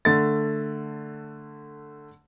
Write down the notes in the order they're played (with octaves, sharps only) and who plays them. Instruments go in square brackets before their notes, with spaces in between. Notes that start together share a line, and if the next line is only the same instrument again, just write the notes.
[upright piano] D3 A3 A6